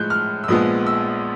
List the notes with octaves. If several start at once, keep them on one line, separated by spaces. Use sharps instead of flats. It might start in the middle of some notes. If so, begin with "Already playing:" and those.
Already playing: A2 F3 G#3 F#6 G6
F6
E6
A#1 A#2 F3 G#3 B3 D#6
E6